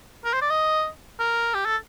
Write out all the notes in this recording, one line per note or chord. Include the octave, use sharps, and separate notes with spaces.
A#4
C5
D5
D#5
A#4
G4
A4